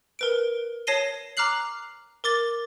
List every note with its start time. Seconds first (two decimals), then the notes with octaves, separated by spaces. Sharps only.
0.19 A#4 B4 D7
0.87 C#5 A5 A#6 C7 D#7 G7
1.37 A#5 D6 F6 F#6 C7 F#7
2.24 A#4 D6 A6 G7